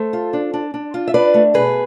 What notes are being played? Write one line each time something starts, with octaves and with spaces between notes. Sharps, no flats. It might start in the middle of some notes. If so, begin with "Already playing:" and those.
Already playing: A3 A4 C5
F4
D4
D4
D4
F4
E5
D4 B4 D5
A3
B2 G#4 B4